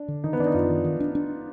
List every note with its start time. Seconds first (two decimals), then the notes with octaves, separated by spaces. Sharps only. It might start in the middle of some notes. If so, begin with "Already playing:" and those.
Already playing: D4
0.08 D3
0.24 D#3 D#4
0.33 B3
0.39 D#3 D4
0.47 D#4
0.54 F#2 F4
0.70 D#3
0.84 D#3
1.00 D4
1.15 D4